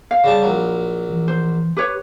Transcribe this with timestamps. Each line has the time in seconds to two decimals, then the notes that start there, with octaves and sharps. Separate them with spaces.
0.11 F5
0.24 C#3 G3 A5
0.43 A#1 F#3
1.10 E3
1.28 C5
1.77 G4 B4 C#5